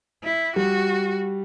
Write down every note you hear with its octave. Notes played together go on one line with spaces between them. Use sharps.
E4
G3 F#4